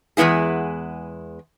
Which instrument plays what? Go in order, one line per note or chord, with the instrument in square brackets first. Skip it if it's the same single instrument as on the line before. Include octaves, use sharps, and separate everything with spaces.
[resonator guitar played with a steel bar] E2 G#3 B3 E4 G#4